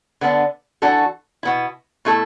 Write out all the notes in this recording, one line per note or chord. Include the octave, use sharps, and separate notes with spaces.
D3 B3 D4
E3 D4 F#4 A4
B2 B3 E4
B2 A3 E4 A4